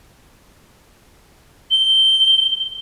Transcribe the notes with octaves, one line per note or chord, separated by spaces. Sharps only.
G7